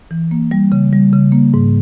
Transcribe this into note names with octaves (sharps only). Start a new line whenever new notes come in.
E3
A#3
G3
C#3
G3
C#3
A#3
G#2